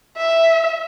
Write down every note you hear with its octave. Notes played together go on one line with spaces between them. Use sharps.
E5